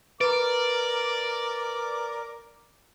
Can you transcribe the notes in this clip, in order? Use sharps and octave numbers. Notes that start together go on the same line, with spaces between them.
A#4 B4 D5 D6